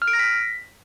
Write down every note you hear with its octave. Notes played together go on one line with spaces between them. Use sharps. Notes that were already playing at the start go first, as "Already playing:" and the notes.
F6
D7
A#6
B6